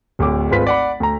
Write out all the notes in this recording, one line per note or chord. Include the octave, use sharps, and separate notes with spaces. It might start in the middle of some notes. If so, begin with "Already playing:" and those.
D1 D2 D3 C#5 D6
G#1 G#3 C4 F4 B4 B6
D5 F#5 B5
D2 A#5